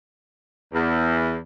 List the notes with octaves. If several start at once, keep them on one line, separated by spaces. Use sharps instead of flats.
E2